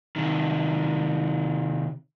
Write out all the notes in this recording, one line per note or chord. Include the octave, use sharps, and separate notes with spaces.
C3 D#3